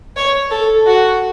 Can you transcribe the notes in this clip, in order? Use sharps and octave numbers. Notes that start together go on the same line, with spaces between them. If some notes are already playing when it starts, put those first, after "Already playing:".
C#5
A4
F#4